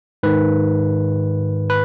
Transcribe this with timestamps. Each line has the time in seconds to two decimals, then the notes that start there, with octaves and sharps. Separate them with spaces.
0.23 G#2 D#3 B4
1.70 B4